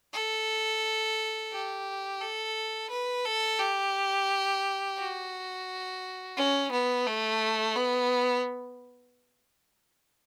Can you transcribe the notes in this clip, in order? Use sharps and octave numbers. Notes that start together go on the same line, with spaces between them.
A4
G4
A4
B4
A4
G4
F#4
C#4
B3
A3
B3